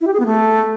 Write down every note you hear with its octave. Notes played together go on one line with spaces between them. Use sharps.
E4
G4
G#4
B3
A3